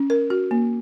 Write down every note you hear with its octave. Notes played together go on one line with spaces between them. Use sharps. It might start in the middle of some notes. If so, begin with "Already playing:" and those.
Already playing: C#4
A#4
F#4
A#3